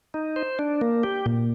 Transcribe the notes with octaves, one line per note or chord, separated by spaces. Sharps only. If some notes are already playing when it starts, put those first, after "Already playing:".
D#4
C5
D4
A#3
G4
A#2